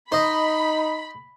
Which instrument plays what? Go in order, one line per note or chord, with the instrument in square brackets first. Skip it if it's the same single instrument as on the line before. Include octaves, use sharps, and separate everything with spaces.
[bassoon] D#4 [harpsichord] C5 D#5 [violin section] B5